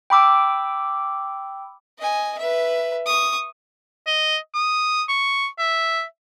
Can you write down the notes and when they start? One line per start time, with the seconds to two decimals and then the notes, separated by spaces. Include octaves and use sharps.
0.10 G5 B5 D6 E6
1.99 D#5 G#5
2.38 B4 E5
3.06 C#6 D#6
4.07 D#5
4.54 D#6
5.09 C#6
5.58 E5